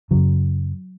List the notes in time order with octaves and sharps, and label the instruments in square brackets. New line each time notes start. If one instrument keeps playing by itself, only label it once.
[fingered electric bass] F#2 C#3 F#3